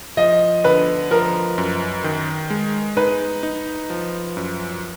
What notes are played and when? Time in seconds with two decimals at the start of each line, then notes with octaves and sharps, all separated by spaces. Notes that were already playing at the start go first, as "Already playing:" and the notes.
0.17 F3 D#5
0.64 D3 B4
1.11 F3 A#4
1.58 F#2
2.04 D#3
2.50 G#3
2.96 D#4 B4
3.43 D#4
3.90 F3
4.37 F#2